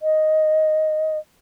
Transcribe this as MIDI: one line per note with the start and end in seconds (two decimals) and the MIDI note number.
0.01 1.18 75